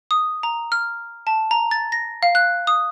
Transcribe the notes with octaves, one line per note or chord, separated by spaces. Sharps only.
D#6
A#5
F6
A5
A#5
A6
A#6
F5
F#6
D#6